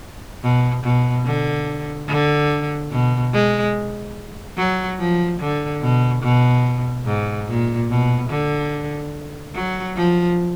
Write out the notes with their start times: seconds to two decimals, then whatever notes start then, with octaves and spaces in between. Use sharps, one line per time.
0.43 B2
0.84 B2
1.25 D3
2.08 D3
2.91 B2
3.33 G#3
4.58 F#3
4.99 F3
5.40 D3
5.82 B2
6.23 B2
7.06 G#2
7.48 A#2
7.90 B2
8.30 D3
9.55 F#3
9.96 F3